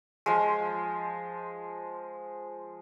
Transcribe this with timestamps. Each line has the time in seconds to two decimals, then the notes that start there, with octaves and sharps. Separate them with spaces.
0.26 F3 G#3